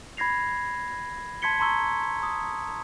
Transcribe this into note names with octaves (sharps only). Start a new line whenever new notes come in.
B5 G#6 A#6 C7 F7
A5 C6 G#6 B6 C#7 G7
A5 A#5 C6 C#6 E6 G7
D#6